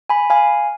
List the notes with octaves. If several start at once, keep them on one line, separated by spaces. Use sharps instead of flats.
G#5 B5
F5 G#5